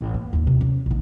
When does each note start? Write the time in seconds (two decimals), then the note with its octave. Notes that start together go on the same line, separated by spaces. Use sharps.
0.01 A1
0.14 A#3
0.33 D#2 G#2
0.47 C3
0.61 C#4
0.86 A#1 D#3